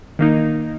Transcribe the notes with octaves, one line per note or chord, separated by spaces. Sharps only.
D#3 A#3 D#4